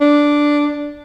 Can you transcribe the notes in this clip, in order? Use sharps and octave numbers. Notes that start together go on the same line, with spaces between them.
D4